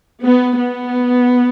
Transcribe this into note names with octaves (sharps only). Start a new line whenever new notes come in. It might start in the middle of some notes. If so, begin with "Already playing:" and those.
B3
B3